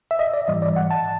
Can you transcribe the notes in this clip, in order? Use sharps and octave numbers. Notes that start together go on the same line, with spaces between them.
E5
D#5
D5
G#2 E3 G3 D#5
D5
F#5
A5